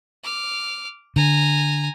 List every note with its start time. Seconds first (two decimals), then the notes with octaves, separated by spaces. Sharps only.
0.24 D6 F6
1.16 D3 G#5 A#5